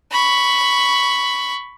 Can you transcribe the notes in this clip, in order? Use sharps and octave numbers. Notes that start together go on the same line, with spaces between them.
B5 C#6